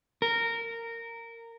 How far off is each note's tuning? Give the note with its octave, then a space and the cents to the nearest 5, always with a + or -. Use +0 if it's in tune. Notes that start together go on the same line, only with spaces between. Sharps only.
A#4 -15